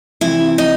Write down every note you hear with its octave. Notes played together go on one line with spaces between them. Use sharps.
C3 E3 E4 E5
D#4 D#5